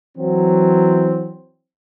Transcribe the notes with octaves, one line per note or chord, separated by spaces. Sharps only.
E3 F#3 C4